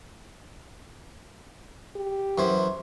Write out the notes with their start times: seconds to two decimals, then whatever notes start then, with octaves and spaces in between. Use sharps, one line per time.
1.96 G4
2.38 F#2 E3 C5